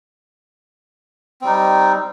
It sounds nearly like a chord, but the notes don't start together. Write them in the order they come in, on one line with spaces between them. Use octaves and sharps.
C4 G3 D#4